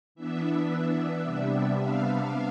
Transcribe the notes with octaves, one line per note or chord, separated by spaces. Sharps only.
E3 B3 D4 E5
C3 G3 B3 D4
F5